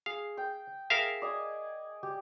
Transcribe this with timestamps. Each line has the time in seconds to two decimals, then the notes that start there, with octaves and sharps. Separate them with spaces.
0.06 G#4 F5
0.37 G5
0.90 G#4 A#4 E5 F5
1.22 D5 D#5 G#5
2.03 G4